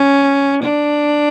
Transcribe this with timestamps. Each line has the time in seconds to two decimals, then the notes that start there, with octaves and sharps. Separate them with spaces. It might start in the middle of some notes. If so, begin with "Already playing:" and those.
Already playing: C#4
0.63 D4